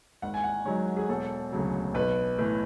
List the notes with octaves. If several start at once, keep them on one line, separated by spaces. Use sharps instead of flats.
G#1 F#5
G#5
F#5
G#2 F#3 C#5
G#4
E1 A4
D2 C#3 F#3
B1 B4
A2 E3